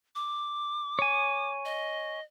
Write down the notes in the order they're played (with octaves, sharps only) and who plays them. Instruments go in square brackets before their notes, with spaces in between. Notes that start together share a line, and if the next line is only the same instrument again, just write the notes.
[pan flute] D6
[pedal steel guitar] C#5 G#5
[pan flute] D#5